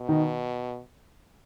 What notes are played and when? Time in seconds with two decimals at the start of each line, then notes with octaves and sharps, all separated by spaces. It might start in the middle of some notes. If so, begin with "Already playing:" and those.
Already playing: B2
0.09 D#3 D#4